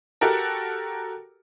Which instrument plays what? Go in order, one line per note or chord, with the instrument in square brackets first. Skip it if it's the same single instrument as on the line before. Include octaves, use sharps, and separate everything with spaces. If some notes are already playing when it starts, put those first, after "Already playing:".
[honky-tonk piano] F#4 G4 A4 A#4